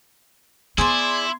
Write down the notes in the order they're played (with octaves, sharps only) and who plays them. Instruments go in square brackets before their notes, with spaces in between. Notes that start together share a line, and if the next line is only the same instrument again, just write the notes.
[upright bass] B3 [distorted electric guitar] E4 [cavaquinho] G#4 C5 D5 [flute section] C6 G#6